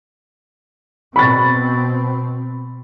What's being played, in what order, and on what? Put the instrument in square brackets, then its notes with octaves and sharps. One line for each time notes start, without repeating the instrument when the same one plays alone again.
[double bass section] B2 C4 [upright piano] B5 C#6 A6